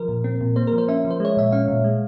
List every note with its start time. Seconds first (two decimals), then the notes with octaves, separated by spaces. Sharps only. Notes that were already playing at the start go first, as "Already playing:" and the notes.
Already playing: F3 A#4
0.08 A#2
0.24 C4
0.41 A#2
0.56 A#3 C5
0.67 A#4
0.73 F3
0.78 C5
0.88 C#4 E5
1.05 F3
1.11 C5
1.20 G#3 C#5
1.37 A#2 E5
1.52 C#4 F5
1.68 A#2
1.84 G#3